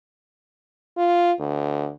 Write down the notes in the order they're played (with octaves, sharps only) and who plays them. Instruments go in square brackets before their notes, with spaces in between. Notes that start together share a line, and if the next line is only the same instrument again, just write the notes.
[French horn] F4
D2